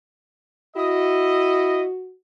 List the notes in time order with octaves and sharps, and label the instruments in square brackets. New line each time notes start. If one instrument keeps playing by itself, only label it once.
[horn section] E4 D#5 [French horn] F#4